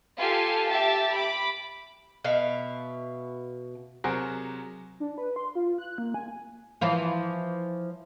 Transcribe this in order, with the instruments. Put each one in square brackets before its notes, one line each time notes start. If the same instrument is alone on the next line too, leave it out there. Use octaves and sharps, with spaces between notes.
[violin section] F4 G4 A4 F5 G#5
G4 E5 A5 A6
B5 D6
[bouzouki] B2 E5 F5
[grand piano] C3 F#3 F#4 G#4 A#4 C5
[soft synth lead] D4
B4
C6
F4
F#6
A#3
G#5
[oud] E3 F3 F4